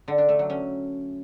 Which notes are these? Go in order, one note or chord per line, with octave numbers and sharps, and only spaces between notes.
D3
D4
A3
F#3
C#4